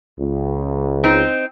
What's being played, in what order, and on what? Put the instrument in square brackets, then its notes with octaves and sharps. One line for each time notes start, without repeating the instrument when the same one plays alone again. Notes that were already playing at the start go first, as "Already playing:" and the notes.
[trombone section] C#2
[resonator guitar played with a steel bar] C4 D#4